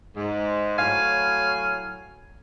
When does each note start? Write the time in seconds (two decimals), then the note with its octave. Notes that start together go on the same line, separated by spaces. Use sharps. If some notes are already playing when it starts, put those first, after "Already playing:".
0.16 G#2
0.78 A2 F#3 F5 G#5